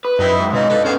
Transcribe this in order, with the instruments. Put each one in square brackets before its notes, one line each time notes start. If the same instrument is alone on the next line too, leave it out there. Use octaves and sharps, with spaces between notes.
[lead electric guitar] B4
[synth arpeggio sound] F#2 [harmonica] D#4 E4 C5 [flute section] G5 B5 D#6
[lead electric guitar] G#2
[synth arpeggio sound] B2 [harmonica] C4 C#4 D#4 [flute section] D#5 F5
[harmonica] D4 D#4 B4 [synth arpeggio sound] A4
[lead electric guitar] B3 C#4 [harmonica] G#4 C5 F5